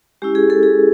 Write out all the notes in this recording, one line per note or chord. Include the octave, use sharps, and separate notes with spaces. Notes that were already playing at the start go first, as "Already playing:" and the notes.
G#3 C#4 E4 G4
G#4
A4
G#4